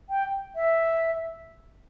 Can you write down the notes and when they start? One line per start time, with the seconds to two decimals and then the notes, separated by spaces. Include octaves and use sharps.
0.09 G5
0.55 E5